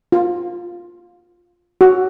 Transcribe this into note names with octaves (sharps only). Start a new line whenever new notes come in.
F4
F#4